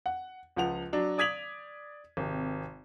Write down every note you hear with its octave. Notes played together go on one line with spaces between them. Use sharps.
F#5
C#2 F3 F#5 F7
F#3 D4
D5 D#6 G#6 B6 F7 F#7
G#1 C3